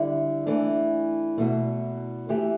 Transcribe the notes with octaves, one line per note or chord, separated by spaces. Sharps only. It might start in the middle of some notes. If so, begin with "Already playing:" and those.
Already playing: D3 G3 E4
E3 A3 D4
E2 B2 A3
E3 A3 G4